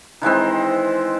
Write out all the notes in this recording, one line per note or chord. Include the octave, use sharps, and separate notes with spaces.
D#3 E3 G#3 C4